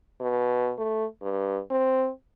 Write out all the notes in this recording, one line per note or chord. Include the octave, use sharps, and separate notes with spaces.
B2
A3
G2
C4